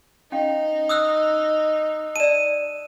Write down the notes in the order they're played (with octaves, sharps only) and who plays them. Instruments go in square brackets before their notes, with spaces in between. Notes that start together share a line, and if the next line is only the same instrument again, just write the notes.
[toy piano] C#4 F5 G5 [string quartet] D#4
[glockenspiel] D#6 E6 F#6
[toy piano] D5 A5 [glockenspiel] D#7 E7